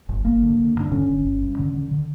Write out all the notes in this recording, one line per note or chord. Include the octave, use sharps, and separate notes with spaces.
G1
G1 A#3
D3
D3
G2
D4
D3 C#4
G1
G1
G2
D3
D3
D3